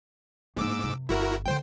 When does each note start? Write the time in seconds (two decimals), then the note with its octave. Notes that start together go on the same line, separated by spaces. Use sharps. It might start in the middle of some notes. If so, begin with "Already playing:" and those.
0.57 G#2 A#3 D#4 D6 E6
0.83 F#2 C3
1.09 G1 E4 F#4 A#4
1.46 D3 C4 C5 G5